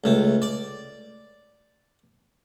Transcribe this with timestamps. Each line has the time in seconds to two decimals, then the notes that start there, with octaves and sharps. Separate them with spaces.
0.04 C#2 A3
0.42 D5